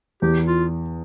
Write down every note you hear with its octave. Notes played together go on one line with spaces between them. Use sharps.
E2 G4
F4